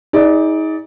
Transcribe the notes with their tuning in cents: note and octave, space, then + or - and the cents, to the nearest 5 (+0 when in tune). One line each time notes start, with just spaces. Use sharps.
D#4 +35 G#4 +0 D5 +0